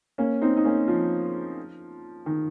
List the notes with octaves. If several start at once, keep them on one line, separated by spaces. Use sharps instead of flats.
A#3 C#4
C4 D#4
D#4
A#3 C#4
F3
D#3